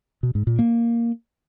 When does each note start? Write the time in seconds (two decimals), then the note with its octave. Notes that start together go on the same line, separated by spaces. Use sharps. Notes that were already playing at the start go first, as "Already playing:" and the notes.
0.23 B2
0.35 G#2
0.47 A#2
0.59 A#3